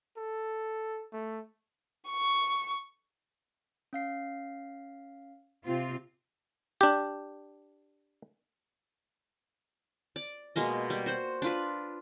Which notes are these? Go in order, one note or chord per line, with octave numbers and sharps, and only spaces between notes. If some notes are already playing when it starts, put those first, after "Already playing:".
A4
A3
C#6
C#4 F5 C7
C3 C4 F4
D4 G4
D5
B2 G#3 A#3 D#5
G3
F#4 C5
D4 F4 B4